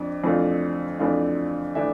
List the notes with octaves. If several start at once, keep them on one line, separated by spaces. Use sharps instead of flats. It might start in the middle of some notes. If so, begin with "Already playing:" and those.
Already playing: F2 D4
F2 E3 A3 D4 F4
F2 E3 A3 D4 F4
E3 A3 D4 E5